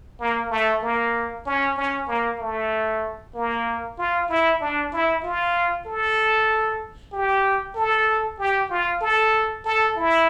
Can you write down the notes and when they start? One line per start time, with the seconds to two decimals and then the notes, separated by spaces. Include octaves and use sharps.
0.20 A#3
0.51 A3
0.82 A#3
1.46 C#4
1.77 C#4
2.08 A#3
2.40 A3
3.35 A#3
3.98 F4
4.29 E4
4.61 D4
4.92 E4
5.23 F4
5.86 A4
7.12 G4
7.75 A4
8.39 G4
8.70 F4
9.01 A4
9.65 A4
9.96 E4